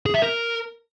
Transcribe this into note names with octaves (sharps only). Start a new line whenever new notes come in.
G#4
E5
A#4